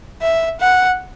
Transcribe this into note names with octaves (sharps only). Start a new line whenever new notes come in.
E5
F#5